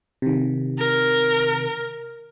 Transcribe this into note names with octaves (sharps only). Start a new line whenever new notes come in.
C3 D#3
A#4